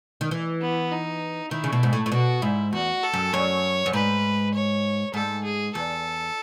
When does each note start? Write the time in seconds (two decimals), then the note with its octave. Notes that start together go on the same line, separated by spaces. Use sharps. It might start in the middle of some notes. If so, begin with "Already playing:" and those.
0.21 D#3
0.31 E3
0.61 B3
0.91 D#4
1.51 D#3 E4
1.64 C#3
1.72 B2
1.83 G#2
1.93 A2
2.06 A2
2.12 B2 F#4
2.42 G#2 E4
2.73 E2 F#4
3.03 A4
3.13 F#2
3.33 F#2 C#5
3.86 F#2
3.93 G#2 B4
4.54 C#5
5.14 G#2 A4
5.44 G#4
5.75 E2 A4